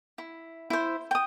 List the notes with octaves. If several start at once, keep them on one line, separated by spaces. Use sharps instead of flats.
E4
E4 C5
G5 D#6